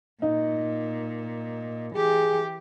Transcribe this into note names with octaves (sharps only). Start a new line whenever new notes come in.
A#2 D#4
E3 G4 G#4